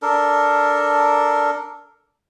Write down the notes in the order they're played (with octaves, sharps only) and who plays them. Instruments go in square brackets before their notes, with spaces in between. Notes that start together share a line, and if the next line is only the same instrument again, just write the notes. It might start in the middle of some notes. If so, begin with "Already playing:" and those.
[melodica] D4 A4 A#4